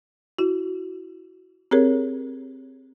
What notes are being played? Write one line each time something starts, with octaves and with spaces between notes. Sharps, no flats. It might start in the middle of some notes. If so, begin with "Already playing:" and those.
E4 F#4
C4 G4 G#4 A#4 C#5